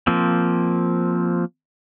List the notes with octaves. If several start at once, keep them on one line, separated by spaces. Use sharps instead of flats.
F3 A#3 C4